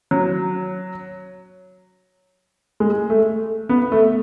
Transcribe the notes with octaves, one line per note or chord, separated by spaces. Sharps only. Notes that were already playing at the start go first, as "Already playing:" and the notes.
F#3
G#3
A3
B3
A3